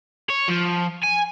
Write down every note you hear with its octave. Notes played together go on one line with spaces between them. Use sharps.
C#5
F3
G#5